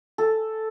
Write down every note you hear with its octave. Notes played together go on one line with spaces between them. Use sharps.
A4